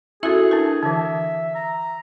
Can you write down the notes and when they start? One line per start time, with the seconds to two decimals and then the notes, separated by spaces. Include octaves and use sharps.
0.23 C#4 E4 F#4 G#4 A4 E5
0.51 D4 A#4
0.83 D3 E3 E5
1.55 A#5